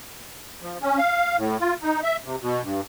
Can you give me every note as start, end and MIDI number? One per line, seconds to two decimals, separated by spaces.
0.62 0.78 53
0.82 0.98 61
0.98 1.37 77
1.38 1.57 45
1.61 1.74 65
1.82 2.01 63
2.03 2.16 76
2.25 2.36 48
2.41 2.62 47
2.63 2.81 43